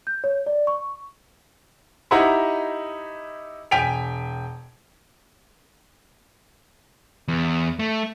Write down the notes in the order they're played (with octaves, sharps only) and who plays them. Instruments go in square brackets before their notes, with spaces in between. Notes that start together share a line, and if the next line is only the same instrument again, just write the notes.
[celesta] G6
C#5
D5
C#6
[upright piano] D#4 E4 G4 D#5 F#5 A#5
E1 G5 G#5 B6 D7 F7
[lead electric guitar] E2
A3